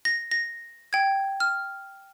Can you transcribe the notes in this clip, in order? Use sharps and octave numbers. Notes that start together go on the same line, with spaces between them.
A#6
A#6
G5 G#6
F6